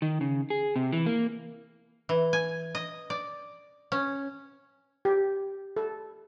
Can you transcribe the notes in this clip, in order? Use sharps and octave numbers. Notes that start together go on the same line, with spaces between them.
D#3
C#3
G#4
C3
E3
A#3
E3
G#5
D#5
D5
C#4
G4
A4